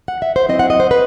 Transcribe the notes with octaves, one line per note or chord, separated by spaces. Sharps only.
F#5
E5
C5
F#3 C4 E4 D#5
F#5
D#5
C5
B4